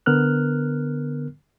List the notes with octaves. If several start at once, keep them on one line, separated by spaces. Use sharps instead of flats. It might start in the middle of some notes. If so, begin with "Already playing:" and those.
D3 B3 A#4 F6 F#6